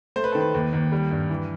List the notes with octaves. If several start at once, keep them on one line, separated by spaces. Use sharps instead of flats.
A3 C5
B4
D#3 A4
B4
D#2
D#2
G3
G2
E3